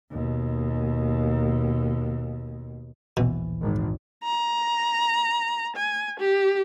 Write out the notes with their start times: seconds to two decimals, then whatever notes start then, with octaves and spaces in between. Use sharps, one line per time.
0.11 D#2 B2
3.17 D#1 A#1 B2 E3
3.62 G#1
4.24 A#5
5.76 G#5
6.20 G4